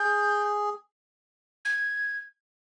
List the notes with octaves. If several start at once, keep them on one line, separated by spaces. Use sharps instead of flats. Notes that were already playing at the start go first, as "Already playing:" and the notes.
Already playing: G#4 G6
G#6